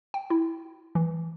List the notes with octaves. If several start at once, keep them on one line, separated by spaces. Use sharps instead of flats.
G5
E4
E3